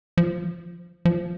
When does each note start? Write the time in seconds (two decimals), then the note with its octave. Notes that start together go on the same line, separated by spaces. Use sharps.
0.18 F3
1.05 F3